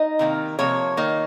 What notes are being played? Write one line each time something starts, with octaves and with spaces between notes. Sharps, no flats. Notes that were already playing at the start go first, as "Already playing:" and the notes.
Already playing: D#4 D#5
C3 D#3 A#3
C3 F3 A#3 C#5
D#3 A#3 D#4